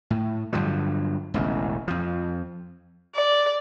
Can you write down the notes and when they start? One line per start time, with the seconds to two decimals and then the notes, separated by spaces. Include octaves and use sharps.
0.10 A2
0.53 G2 D3 F3 F#3
1.34 E1 A1 C#3
1.88 F2 F3
3.15 D5